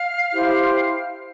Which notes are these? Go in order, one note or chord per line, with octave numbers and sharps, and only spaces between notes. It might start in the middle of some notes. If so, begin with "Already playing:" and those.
Already playing: F5 F6
E4 G4 C5